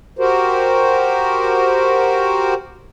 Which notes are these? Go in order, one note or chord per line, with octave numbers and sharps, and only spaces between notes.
F#4 G4 A#4 C5